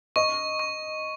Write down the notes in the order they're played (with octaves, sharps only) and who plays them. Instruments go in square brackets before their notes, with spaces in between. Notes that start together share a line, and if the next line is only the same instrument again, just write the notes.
[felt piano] D#5 [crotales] C#6
[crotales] C#6